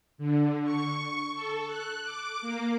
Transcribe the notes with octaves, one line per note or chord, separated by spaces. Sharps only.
D3
C#6
A4
F#6
D6
A#3